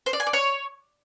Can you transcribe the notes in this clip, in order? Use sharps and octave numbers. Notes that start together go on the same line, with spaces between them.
C5
D5
G#5
D5
C#5